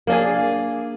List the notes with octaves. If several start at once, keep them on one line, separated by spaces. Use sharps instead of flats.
A#3 D4 G#4